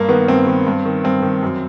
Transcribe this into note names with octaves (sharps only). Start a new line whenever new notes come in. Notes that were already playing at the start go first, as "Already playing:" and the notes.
Already playing: G2 A#3
D#3 B3
G2 C4
D#3
G2
D#3
G2 C4
D#3
F#2